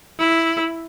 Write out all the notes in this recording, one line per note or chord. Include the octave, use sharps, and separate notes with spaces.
E4